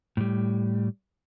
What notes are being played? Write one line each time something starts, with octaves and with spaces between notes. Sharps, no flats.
A2 G3